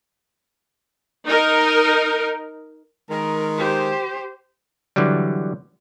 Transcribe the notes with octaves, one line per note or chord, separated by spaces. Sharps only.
D#4 A#4
D#3 G#3 A#4
G4 C5
D3 E3 F#3 G3